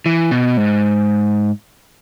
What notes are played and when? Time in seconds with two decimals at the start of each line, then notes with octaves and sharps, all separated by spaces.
0.06 E3
0.31 B2
0.57 G#2